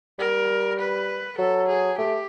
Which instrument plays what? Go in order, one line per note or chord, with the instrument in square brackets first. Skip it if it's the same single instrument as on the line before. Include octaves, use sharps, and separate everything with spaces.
[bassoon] G3 [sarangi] A#4
[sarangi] B4
[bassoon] F#3 [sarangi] A4
[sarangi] G#4
[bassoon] A3 [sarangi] G4